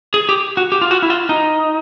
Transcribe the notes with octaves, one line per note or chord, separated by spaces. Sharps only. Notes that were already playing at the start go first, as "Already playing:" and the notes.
G#4
G4
F#4
G4
F4
F#4
E4
F4
D#4